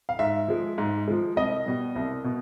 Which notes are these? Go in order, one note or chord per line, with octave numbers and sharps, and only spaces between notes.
F5
G#2 E5
F3 G#3
G#2
F3 G#3
C2 D#5
B2 G3
C2
B2